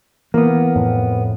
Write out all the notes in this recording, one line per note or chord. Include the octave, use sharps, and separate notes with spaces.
E3 A#3 B3
F2 A2